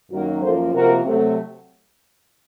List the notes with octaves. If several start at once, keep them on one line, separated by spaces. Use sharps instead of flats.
F#2 D#3 F#3 A#3 F#4 A#4
F#2 F3 A#3 A4 C5
C3 F3 A#3 F#4 A#4
C3 F#3 A3